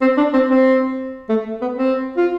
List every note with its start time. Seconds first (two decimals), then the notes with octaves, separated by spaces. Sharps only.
0.01 C4
0.17 D4
0.33 C4
0.50 C4
1.29 A3
1.61 B3
1.78 C4
2.17 F4